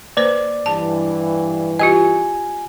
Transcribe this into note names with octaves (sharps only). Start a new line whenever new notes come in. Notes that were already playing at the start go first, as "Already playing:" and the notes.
A#3 B4 C5 D5
G2 E3 A5
F4 G4 D#5 G#5